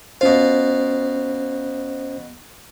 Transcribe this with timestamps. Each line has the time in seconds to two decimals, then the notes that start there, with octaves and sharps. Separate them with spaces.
0.21 B2 C#4 F4 C5